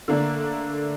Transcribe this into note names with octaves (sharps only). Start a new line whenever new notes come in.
D3 A3 A#3 D4